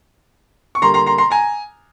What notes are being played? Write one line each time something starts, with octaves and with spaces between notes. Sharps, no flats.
C#6
D3 G3 A#3 A#5 C6
A#5 C6
A#5 C6
A#5 C6
G#5 A#5